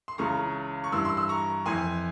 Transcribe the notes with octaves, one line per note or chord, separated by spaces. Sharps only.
C6
C#2 C#3 E3 A#5 C#6
C#6
G2 E3 C6 E6
C6 E6
C6 E6
A#5 C#6
F2 E3 G#5 C6